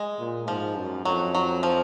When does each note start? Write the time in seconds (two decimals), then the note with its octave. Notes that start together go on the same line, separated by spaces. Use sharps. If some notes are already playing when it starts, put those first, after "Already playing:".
Already playing: G#3
0.19 A#2
0.48 G#2 F3
0.77 F#2
1.05 F2 F#3
1.35 F#3
1.63 F3